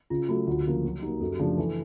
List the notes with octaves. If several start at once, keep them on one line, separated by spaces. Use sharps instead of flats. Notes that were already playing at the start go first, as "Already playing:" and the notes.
C#3 F4
F#3 A3 F#4
D2 F4
C#3 F3 A#3
F#3 F#4
A#3 D#4 G4
F#2 A4
G4
C#3 F3 A3 D4 G#4
E3 A4